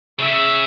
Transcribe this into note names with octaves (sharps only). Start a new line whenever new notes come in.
C#3 E5